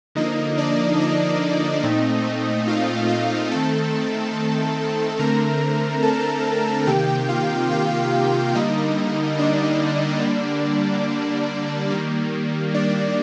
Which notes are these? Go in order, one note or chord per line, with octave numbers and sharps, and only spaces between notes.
D3 F3 A#3 D#4 D#5
D4 D5
D#4 D#5
A#2 A3 C4
F4 F5
F4 F5
D#3 A3 C4 A4 A5
D3 A3 C4 A#4 A#5
A4 A5
C3 D#3 A#3 G4 G5
F4 F5
F4 F5
D3 G3 A#3 D#4 D#5
D4 D5
D3 G3 A#3
D#3 G3 A#3
D4 D5